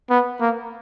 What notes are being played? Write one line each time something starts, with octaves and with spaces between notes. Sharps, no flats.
B3
A#3